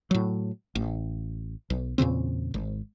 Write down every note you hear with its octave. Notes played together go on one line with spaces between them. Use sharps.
A2 F#3
A1
B1
E2 A#2 C#3 C4
G#1